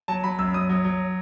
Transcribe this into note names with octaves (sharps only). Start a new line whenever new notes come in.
F#3 A5
F#3 B5
F#2 E6
F#2 D#6
F#3
F#3